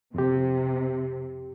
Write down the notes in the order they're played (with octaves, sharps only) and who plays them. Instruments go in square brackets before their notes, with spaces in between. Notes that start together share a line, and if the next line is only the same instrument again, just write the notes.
[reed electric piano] F2 G4 [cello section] C3